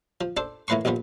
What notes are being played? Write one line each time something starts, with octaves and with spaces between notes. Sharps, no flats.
F3
D4 A4 C5
A2 E3 A#3 B4 C6 C#6
A#1 D#2 A#2 F3 B3